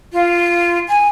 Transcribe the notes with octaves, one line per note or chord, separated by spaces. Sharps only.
F4
G#5